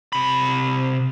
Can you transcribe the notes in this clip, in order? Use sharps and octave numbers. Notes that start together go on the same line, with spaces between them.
C3 B5